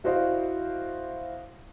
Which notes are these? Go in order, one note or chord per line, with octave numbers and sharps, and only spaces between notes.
E4 F#4 C5 D5 D#5 F5